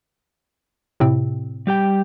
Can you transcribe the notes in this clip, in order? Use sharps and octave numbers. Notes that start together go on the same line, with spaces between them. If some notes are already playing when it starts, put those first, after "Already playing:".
A2 C3 C4
G3 G4 G5